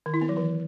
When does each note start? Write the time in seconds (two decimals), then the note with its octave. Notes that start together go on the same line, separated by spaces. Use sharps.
0.06 D#3
0.14 E4
0.21 B3
0.29 F#3
0.37 E3